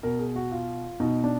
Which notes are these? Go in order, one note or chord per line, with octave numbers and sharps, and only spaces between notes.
B2 A#4
G#4
F#4
F4
B2 D#4
D4